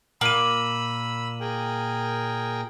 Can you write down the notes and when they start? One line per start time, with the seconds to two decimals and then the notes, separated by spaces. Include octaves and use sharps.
0.21 A#2 A#3 B5 E6 D#7 F#7
1.41 G#4 A#4 G5